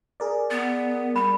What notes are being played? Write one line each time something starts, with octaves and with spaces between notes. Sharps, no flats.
G#4 A#4 D5
B3
G3 B5